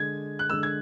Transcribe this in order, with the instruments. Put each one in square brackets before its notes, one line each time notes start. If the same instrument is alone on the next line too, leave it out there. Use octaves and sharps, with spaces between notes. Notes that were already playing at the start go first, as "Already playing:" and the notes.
Already playing: [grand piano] D3 G#3 G#6
F#6
D3 G#3 E6
G#6